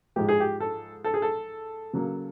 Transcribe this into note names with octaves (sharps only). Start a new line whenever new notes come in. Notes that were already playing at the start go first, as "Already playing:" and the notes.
G#2 F3 G#3 G4
G#4
G4
A4
A4
G#4
A4
C#3 F#3 A#3